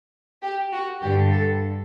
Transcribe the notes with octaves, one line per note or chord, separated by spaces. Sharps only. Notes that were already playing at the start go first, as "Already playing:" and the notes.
G4
F#4
G2 D3 G4
A4